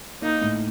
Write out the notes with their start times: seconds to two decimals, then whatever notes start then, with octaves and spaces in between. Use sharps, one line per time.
0.22 A#3 D#4
0.41 A2